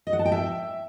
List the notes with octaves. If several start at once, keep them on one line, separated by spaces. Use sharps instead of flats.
D#5
F#5
A5
G5
E5